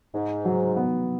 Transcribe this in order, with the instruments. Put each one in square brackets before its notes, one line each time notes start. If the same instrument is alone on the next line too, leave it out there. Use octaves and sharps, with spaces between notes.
[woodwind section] G#2 [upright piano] D#4
[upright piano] F#3
B3